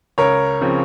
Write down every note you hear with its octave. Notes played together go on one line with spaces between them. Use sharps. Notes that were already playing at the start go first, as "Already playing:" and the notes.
C#2 A#4 C#5
C#3 F3 C4